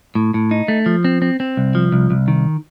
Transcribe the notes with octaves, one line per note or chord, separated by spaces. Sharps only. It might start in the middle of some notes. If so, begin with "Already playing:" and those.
A2
A2
D#4
A3
F3
C4
C4
C4
C2
F3
C2
C2
D#3